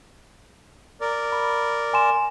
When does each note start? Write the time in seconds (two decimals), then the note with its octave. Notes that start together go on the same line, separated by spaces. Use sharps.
1.01 A#4 D5
1.32 B5
1.93 G#5 C6 E7